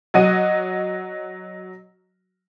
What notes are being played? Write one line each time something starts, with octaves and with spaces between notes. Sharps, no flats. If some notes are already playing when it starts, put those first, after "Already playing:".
F#3 F#4 D#5 D#7